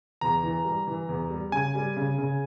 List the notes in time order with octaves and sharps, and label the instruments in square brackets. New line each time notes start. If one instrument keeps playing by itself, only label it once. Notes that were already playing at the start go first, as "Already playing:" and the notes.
[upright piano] E2 [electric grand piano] A#5
[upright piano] E3
G3
E3
E2
G3
[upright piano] C#3 [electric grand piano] G#5
[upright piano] G3
C#3
C#3